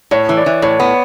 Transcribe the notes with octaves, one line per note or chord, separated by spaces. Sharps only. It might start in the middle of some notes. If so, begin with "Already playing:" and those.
A2 C#5
E3
D5
E3
A2 C#5
B3